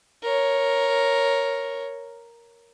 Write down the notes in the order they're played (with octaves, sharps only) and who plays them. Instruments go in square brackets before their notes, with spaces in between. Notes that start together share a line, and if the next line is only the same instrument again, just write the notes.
[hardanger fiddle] A#4 C#5